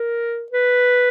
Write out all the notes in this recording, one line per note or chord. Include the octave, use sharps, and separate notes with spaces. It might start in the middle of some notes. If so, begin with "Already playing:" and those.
Already playing: A#4
B4